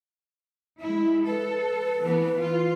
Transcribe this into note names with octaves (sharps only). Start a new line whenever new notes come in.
G#3 E4 E5
A4 B4
E3 B3
F4